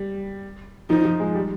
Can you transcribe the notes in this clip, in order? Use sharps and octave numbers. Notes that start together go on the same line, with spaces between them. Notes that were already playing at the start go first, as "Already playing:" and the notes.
Already playing: G3
F3 D#4
F3
G#3
G3